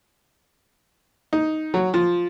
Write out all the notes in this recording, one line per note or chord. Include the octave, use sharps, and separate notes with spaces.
D#4
F#3
F3